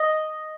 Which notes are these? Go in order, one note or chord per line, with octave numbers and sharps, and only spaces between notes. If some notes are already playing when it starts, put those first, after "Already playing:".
Already playing: D#5